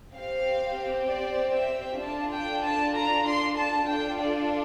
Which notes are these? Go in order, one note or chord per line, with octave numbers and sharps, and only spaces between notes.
C4 G4 F5
D5
E5
D4 F4 A4 A5
G5
A5
A#5
C6
A5
D4 F4 A4 G5
D5